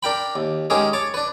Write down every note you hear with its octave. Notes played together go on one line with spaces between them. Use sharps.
D4 A#4 G5 B5
D#2
G#3 C#4 D#4 G4 G#4 A#4
C#5 A5 D6
D4 B4